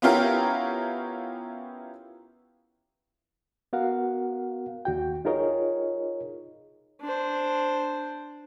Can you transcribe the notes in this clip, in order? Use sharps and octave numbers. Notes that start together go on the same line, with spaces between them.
B3 C#4 E4 F4 G4 A#4
B3 F#4 A#4 F5 F#5
D#2 F#4 G5
D#4 F4 G#4 A#4 C#5 D#5
D4 C5